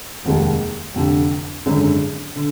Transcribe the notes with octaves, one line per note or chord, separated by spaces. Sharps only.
F1 D#2 D#3 G#3
F1 F2 D3
G#1 F#2 D3 G#3
D3